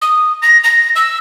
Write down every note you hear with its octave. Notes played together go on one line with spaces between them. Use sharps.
D#6
A#6
A#6
E6